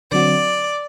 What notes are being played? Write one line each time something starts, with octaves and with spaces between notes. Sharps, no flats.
D3 F#3 C4 F#4 D5